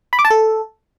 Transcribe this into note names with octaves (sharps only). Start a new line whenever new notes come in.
B5
D6
A5
A4